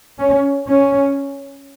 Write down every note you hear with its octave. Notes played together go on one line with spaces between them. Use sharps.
C#4
C#4